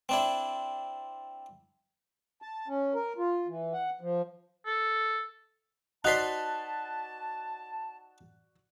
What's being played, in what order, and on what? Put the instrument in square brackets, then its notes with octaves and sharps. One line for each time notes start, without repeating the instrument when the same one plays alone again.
[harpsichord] C4 D4 E4
[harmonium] A5
C#4
A#4
F4
E3
F#5
F3
[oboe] A4
[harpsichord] D#4 C5 C6 [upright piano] F#4 D5 [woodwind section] A5 [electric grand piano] F#6 B6